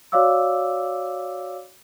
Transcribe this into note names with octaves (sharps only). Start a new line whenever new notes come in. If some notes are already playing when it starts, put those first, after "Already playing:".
F#4 C#5 D5 F5 D6 E6